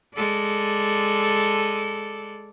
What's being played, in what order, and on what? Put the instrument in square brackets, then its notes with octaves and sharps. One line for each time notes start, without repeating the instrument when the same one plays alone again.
[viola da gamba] G#3 A4 D5